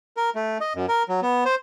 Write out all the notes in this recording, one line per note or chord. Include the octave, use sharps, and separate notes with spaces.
A#4
A3
D#5
F#2
A#4
F#3
B3
C5